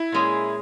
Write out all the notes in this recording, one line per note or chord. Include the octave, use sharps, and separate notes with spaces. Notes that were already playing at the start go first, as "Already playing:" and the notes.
Already playing: E4
A#2 G#3 C#4 G#4